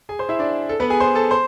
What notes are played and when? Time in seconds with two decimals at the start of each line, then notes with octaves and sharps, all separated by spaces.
0.09 G#4 G#5
0.19 C5 C6
0.29 E4 E5
0.39 D4 D5
0.69 A4
0.80 B3 B4
0.90 G#4 G#5
1.00 C5 C6
1.15 A4 A5
1.31 C5 C6